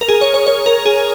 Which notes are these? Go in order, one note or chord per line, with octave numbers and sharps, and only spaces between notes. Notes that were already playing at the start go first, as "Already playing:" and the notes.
A#4
G#4
C#5
C#5
C#5
A#4
G#4